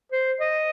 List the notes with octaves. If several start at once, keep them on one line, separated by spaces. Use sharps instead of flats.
C5
D#5